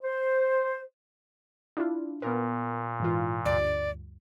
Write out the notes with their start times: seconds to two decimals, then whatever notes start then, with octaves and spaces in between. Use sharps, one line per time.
0.03 C5
1.77 D4 E4 F4
2.22 A#2 B3 A#4
3.00 G#2 E3 F4
3.45 D2 G2 D5